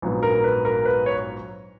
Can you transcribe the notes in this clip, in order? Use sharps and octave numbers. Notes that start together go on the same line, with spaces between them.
A#1 G#2 F#3 B3
A#4
B4
A#4
B4
C#5